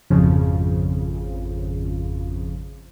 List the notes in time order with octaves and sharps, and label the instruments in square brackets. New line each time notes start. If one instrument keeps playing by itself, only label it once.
[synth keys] G#1 F2 C#3 F3